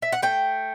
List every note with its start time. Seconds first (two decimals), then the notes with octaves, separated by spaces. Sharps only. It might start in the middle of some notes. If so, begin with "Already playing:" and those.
0.02 E5
0.12 F#5
0.22 A3 G5